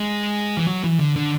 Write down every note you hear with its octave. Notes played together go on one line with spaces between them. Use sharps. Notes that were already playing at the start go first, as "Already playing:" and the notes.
Already playing: G#3
E3
F#3
E3
D3
D3